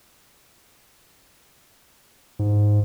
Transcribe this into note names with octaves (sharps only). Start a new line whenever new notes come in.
G#2